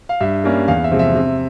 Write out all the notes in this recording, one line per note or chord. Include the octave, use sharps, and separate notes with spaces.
F5
G2 E5
G3 A#3 C#4
E2 F5
E5
C3 F3 G#3
E5
C3